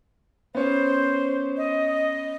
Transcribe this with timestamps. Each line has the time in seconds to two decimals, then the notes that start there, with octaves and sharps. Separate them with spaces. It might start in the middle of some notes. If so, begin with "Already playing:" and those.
0.55 B3 C#4 C5
1.57 D#5